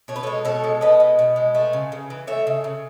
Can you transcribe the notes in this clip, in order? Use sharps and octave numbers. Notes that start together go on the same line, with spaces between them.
B2 C#5
B4
G#3 A4 C#5
B2 A4 C#5
G#3
B2 B4 D#5
G#3
B2
G#3
A3
C#3
C#3
E3
A3 C#5 E5
C#3
C#3